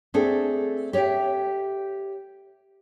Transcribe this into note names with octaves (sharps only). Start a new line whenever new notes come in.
A3 C4 D4 G#4 A4
G4 C#5 D5 E5 G5